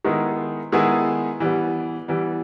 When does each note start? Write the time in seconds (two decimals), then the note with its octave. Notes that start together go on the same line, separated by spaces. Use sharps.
0.05 D#3 G#3 B3 E4 G#4
0.72 D#3 G#3 B3 E4 G#4
1.40 E3 G3 B3
2.08 E3 G3 B3